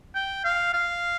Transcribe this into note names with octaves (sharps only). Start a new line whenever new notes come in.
G5
F5
F5